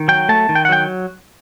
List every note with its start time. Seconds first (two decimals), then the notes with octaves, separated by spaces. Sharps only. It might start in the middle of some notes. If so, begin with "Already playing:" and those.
Already playing: D#3
0.08 F#3 G5
0.29 A3 A5
0.49 D#3
0.55 G5
0.65 F#5
0.69 F#3 G5